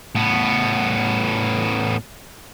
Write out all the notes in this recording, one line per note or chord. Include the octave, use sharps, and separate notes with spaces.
A2 B3